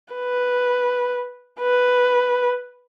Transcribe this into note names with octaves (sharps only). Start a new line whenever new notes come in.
B4
B4